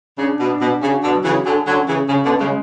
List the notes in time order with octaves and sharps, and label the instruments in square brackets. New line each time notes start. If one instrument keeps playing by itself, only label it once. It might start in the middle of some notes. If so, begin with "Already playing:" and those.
[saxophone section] C#3 [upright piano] D4
[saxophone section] B2
[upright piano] D4
[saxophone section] B2
[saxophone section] C#3 [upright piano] F#4
[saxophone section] B2 D3
[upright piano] F#3
[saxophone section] C#3 E3
[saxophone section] D3 F#3 [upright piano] G#4
[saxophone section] D3 F#3
[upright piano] C#4
[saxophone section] C#3 E3
[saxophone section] C#3 [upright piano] C#4
[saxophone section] B2 D3
[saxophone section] C#3 [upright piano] G#3